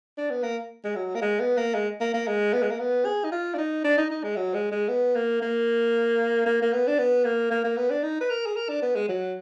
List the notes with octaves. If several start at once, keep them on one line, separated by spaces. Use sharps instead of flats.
D4
B3
A#3
G#3
F#3
A#3
G#3
B3
A#3
G#3
A#3
A#3
G#3
B3
G#3
A#3
B3
G#4
D#4
F4
D4
D#4
D4
D#4
D#4
G#3
F#3
G#3
G#3
B3
A#3
A#3
A#3
A#3
B3
D4
B3
A#3
A#3
A#3
B3
D4
D#4
B4
A#4
G#4
A#4
D4
B3
G#3
F#3